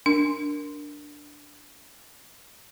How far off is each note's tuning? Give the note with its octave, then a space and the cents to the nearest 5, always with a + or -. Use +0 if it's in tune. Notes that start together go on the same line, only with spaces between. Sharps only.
D4 +0 A#4 +0